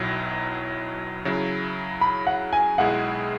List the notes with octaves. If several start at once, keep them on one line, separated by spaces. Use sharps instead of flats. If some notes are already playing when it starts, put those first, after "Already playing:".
Already playing: B1 B2 F#3 E4
C#3 F#3 E4
B5
F#5
G#5
B1 B2 G#3 E4 G#4 F#5